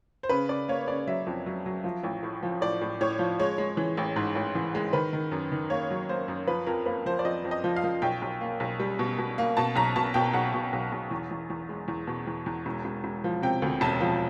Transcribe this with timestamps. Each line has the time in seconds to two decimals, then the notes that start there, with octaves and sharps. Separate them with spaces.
0.23 C5
0.29 C#3 B4
0.49 C#3 D5
0.68 A#3 C#5
0.88 C#3 D5
1.07 F#3 E5
1.27 F2
1.46 F#3
1.66 F#3
1.84 F3
2.03 A1
2.23 A2
2.43 F3
2.61 A2 D5
2.81 A2
3.01 A2 C#5
3.19 F3
3.40 G#3 C#5
3.58 G#3
3.77 E3
3.97 A1
4.16 G#2
4.35 A1
4.55 E3
4.75 G#3
4.93 D#3 B4
5.13 D#3
5.31 F#2
5.52 D#3
5.70 A#3 C#5
5.90 F#3
6.09 A#3 C5
6.28 F#2
6.47 F3 B4
6.67 F2 A#4
6.86 A#3 B4
7.05 F3 C5
7.19 D5
7.25 F2 D#5
7.44 F2
7.51 D#5
7.64 F3
7.76 F5
7.84 F3
8.02 B1 G5
8.22 B1
8.41 A#3
8.60 B1
8.80 G3
8.99 B2
9.18 B2
9.38 A#3
9.57 B2 A5
9.76 B1 A#5
9.96 B2 A5
10.14 B2 G5
10.33 B1 F#5
10.54 B2
10.73 B1
10.92 B1
11.11 E2
11.31 E2
11.50 E2
11.69 G#3
11.88 E2
12.07 B2
12.27 E2
12.46 E2
12.66 E1
12.85 E1
13.04 E1
13.24 F3
13.42 C3 G5
13.62 D2
13.81 E1 A5
14.01 F3